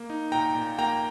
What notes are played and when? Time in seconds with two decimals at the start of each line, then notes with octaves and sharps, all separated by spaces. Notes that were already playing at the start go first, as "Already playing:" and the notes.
Already playing: A#3
0.10 D#4
0.32 A#2 G5 A#5
0.55 A#2
0.78 A#3 G5 A#5